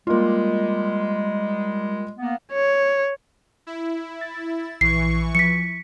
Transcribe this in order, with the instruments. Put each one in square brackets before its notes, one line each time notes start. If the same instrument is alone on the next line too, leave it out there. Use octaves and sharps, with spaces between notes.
[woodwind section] G3 G#3 [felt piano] A#3 F4
[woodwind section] A#3 B3
[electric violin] C#5
[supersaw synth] E4
[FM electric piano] A6
[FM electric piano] A#1 [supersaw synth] E3 C#6 [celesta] C7
[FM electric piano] F3 [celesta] B6 C#7